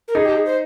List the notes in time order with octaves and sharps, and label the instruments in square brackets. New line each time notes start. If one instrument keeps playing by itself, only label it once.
[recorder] A#4
[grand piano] D#4 [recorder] G#4
[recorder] G4
G#4
C5